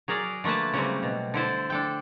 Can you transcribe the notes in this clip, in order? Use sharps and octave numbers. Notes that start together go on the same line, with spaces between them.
F#3 G#4 A#4 D5
D3 A3 A#3 B4 A5
C#3 F#3 G3 C4
B2
D3 E4 C5 A5
D4 A4 G5